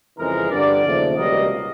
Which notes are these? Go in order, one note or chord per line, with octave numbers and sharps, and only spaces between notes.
F2 C#3 E3 G#3 A#4
G2 D3 G3 D5
D#2 C#3 F3 A3
C#2 B2 G3 A#3 D#5